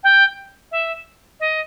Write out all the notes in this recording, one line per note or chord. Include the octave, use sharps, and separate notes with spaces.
G5
E5
D#5